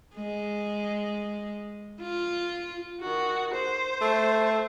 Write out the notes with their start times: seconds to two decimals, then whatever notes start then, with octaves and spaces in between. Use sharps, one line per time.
0.16 G#3
2.01 F4
3.01 D#3 F#4
3.54 C5
4.01 A3